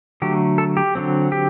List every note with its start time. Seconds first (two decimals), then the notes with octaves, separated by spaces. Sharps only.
0.22 D3 F#3 A3 G4
0.58 A4
0.77 G4
0.95 D3 F#3 C4
1.32 G4